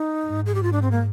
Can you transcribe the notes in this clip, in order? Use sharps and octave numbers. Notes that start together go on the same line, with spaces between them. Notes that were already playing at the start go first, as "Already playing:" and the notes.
Already playing: D#4
G#2
G#4
G4
F4
D4
C4
A#3